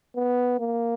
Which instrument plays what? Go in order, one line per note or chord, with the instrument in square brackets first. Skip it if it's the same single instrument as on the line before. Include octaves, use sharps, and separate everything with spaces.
[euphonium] B3
A#3